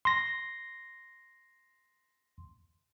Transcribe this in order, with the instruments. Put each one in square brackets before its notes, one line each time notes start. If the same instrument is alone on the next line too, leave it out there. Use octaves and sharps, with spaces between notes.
[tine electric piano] C6 A#6